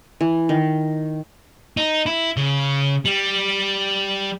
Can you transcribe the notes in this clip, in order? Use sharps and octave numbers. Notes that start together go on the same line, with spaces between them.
E3
D#3
D#4
E4
C#3
G3